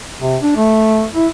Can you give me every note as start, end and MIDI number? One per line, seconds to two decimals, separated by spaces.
0.21 0.37 48
0.42 0.53 62
0.56 1.04 57
1.15 1.27 64